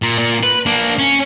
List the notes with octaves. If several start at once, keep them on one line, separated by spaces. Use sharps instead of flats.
A#2
A#2
B4
A#3 D4
C#4